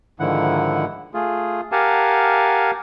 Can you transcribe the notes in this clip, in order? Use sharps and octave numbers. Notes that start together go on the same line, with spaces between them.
G#2 D3 D#3 F3 E4 F#5
A3 F4 G#4
G4 A#4 F5 F#5 G#5 A5